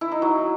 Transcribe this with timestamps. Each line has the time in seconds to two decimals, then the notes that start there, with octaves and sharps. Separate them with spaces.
0.01 E4
0.12 D#4
0.22 F#3